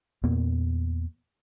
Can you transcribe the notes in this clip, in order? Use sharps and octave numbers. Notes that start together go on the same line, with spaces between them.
E2 A#2 A#3 B3